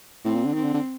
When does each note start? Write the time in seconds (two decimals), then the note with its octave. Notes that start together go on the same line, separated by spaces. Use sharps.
0.25 A2 C4
0.35 A#2
0.45 D3
0.54 D#3 C4
0.64 D3
0.74 D3